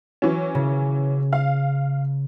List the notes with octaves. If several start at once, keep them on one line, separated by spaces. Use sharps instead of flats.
E3 F#3 C#4
C#3
F5